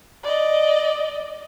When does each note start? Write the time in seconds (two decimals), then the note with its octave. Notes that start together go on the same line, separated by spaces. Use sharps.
0.24 D5 D#5